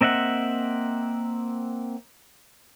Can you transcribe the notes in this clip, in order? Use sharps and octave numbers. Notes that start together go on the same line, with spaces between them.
A#3 C4 D#5 E5 F#5